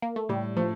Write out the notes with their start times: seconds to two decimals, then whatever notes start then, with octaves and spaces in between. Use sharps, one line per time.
0.02 A#3
0.16 A3
0.29 A2 G3
0.57 F3 A3